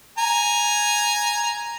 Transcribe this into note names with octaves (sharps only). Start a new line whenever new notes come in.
G#5 A#5